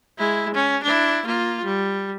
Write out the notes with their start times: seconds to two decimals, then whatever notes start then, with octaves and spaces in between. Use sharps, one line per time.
0.18 G#3 E4
0.54 C#4
0.83 D4 E4
1.25 A#3 F4
1.64 G3